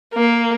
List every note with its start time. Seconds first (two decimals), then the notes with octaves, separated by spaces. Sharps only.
0.14 A#3